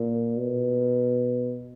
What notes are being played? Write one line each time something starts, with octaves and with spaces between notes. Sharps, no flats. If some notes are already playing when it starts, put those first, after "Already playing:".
Already playing: A#2
B2